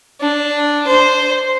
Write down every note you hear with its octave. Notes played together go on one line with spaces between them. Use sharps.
D4
C5